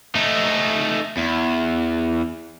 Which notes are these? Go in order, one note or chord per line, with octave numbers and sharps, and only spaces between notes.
A3 D#4
E2